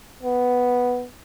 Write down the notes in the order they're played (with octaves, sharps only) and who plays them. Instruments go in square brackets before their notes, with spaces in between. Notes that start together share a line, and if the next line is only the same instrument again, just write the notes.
[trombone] B3